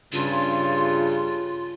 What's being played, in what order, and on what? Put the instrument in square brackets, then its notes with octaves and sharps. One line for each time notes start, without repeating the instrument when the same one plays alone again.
[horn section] G2 C#3 [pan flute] F4